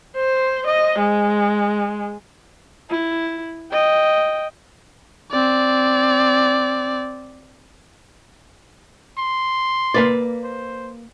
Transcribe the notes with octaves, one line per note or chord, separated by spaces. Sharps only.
C5
D#5
G#3
E4
D#5 G5
C4 D5
C6
A#3 B4 D5
C5